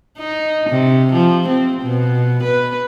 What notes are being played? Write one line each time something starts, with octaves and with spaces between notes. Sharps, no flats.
D#4
C3
F3
C4
B2
B4